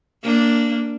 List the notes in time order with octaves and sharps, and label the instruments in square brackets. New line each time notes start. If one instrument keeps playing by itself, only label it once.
[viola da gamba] A#3 D4